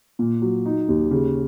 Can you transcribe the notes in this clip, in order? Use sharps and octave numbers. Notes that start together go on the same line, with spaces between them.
A#2
F#3
D#4
D#2
C#3